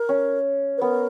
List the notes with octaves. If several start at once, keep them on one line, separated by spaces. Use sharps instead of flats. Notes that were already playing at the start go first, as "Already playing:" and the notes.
Already playing: A#4
C#4
B4
B3 A#4